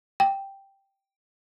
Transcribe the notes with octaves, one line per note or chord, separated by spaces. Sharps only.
G5